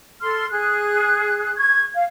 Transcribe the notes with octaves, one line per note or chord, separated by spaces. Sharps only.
A4 C6 F6
G#4 F#6
C#6 G#6
F5